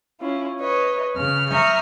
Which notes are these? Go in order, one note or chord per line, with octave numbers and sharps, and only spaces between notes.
C#4 E4 F4
B4 C#5 D#5
C#3 F6
E5 A#5 C#6 D#6 F6 G6